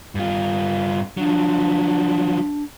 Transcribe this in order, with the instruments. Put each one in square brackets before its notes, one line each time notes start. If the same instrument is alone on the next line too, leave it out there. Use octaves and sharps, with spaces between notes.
[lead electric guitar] G2 F4
[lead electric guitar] F3 F#3 [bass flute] D4